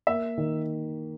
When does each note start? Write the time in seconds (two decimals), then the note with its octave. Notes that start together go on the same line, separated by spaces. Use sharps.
0.07 A#3 E5
0.37 D#3